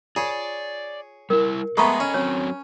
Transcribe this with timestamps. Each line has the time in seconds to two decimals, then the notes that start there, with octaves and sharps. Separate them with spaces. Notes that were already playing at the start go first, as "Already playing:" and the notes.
0.16 F4 G#4 C#5 D5
1.30 G3 E4 A#4
1.77 G#3 A3 B3 A4 D#5 A#5 B5 C#6
2.00 C#4
2.14 F#3 C4 C#5